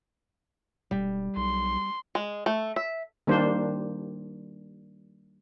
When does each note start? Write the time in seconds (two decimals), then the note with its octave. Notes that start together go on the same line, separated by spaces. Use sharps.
0.91 E1 G3
1.37 B1 C6
2.15 G#3
2.46 A3
2.76 E5
3.27 D#3 G3 A#3 D4 C5